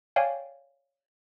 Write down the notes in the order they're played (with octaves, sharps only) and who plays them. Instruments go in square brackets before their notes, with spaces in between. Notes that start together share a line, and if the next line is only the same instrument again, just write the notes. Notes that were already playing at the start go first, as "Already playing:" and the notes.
[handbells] C#5 D5 F5 G5 G#5